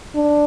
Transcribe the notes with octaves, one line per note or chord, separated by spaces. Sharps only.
D4